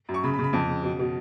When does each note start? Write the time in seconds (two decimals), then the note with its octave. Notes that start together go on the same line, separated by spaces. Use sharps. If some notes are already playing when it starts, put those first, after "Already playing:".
0.09 F#2
0.14 C#6
0.24 C#3 B5
0.34 B5
0.39 C#3
0.44 B5
0.53 F2 A5
0.68 C#3
0.83 B2
0.99 B2